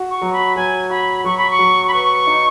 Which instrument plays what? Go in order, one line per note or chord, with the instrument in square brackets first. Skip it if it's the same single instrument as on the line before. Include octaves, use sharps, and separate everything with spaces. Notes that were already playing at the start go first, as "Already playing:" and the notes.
Already playing: [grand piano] F#4
[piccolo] C#6
[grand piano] F#3
[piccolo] B5
[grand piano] F#3 [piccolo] G#5
[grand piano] F#4 [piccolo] B5
[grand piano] F#3 [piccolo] C#6
[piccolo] B5
C#6
[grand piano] F#3
[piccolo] B5
[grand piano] B4 [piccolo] C#6
[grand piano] D#4